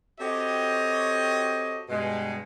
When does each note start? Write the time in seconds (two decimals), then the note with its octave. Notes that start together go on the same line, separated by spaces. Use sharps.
0.20 C4 F#4 G4 A4 C#5 D#5
1.89 G2 B2 G#3